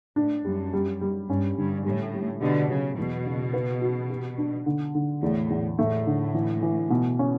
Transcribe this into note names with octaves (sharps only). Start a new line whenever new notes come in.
A2 D4
F#2 G3
G3
G3
G2 C#4
G2 D3
A2 G3
G3
B2 D3 G4
C#3 F#3
E2 B2
C#3
B4
F#4
G4
D4
D3
D3
E2 A2
E2
A2 A3
D3
E3
E3
B2
C#4